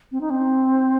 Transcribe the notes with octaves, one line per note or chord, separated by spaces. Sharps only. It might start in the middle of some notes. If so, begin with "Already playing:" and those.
C4
D#4
C4